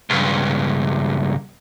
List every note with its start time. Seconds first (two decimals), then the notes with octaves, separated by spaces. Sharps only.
0.10 C#2 G2